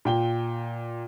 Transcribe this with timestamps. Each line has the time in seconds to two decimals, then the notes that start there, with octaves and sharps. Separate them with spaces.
0.05 A#2 G5 G7